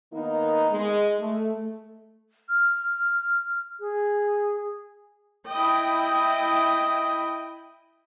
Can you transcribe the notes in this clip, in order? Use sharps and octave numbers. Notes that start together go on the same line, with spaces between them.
D#3 A#3 B3 D#4
G#3
A3
F6
G#4
E4 D#5 G5